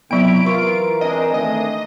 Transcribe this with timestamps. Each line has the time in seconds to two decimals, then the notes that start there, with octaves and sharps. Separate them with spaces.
0.11 F2 C3 F#3 B3 E4 D7
0.46 E3 F4 A#4 C#6
1.01 G#3 C4 D4 D#5
1.34 D#3 A3 D#5